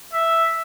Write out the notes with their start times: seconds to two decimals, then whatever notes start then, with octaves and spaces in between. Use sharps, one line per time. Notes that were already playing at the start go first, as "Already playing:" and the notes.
0.13 E5